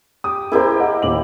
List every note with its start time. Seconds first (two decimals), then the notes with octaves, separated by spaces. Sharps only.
0.24 G4 D#6
0.52 E4 G4 G#4 A#4 C5
0.79 D#5 F#5
1.02 D#2 D6 F#7